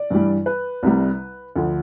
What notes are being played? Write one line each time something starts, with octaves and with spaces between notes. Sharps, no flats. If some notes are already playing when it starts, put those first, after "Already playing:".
Already playing: D5
G2 E3 G3
B4
C2 C3 G3
D2 D3 F3